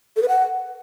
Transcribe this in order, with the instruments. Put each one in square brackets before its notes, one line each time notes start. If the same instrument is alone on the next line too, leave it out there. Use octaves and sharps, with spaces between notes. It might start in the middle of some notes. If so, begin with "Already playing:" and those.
[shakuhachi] A4
B4
F#5